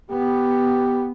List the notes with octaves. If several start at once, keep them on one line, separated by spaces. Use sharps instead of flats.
B3 G4